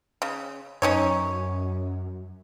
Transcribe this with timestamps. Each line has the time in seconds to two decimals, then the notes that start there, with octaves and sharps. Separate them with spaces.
0.22 C#3
0.82 F#2 C#4 D#4 C#5